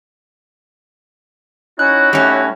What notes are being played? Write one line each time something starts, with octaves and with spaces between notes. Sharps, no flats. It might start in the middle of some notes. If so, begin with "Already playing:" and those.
C#4 D#4 E4 F#4 F#6
A2 G3 C#4